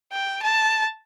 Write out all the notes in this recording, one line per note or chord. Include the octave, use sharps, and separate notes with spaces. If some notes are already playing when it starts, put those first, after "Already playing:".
G5
A5